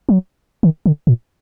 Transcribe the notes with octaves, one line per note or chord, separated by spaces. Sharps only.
F#3
D#3
D3
A#2